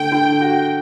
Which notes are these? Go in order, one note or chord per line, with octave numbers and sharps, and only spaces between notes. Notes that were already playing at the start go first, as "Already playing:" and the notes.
Already playing: D3 A3 G5
D3
F#4